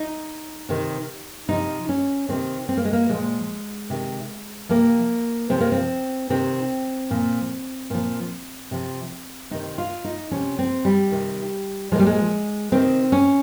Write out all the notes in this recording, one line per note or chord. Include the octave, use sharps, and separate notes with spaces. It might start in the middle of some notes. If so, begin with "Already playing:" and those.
Already playing: D#4
C3 D#3
C3 F3 D#4
C#4
C3 D#3 C4
C4
A#3
G#3
A#3
A#2 F3 G#3
C3 D#3
C3 F3 A#3
C3 F3 C4
A#3
C4
C3 D#3 C4
A#2 F3
A#2 F3
C3 F3
C3 D#3 D#4
F4
D#4
C3 F3 C#4
C4
G3
C3 D#3
A#2 F3 G3 G#3
G#3
C3 D#3 C4
C#4